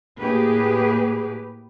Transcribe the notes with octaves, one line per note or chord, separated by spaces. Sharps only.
A2 A#3 G4 G#4 B4